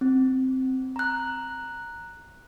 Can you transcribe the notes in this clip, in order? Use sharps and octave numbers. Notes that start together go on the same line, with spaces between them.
C4
A#5 F#6